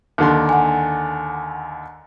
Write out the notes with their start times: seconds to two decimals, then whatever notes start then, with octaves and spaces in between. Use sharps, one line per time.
0.18 D#2 D3 C6
0.49 F#5 G#5